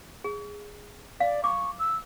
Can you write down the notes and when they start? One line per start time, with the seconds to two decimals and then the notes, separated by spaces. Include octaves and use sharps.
0.24 G#4
1.20 D5 F5
1.44 C#6 D6
1.79 E6